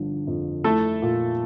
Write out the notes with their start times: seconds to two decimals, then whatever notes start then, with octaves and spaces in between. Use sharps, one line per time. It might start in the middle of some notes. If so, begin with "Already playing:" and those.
Already playing: G1 D3 F3
0.27 F2
0.64 A3 E4 A4
1.02 A#2